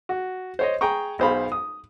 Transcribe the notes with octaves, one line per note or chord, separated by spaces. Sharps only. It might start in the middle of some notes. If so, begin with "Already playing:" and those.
F#4
C5 C#5 D#5
G#4 G5 A#5 C#6
B1 G#4 C5 F5 B5
D#6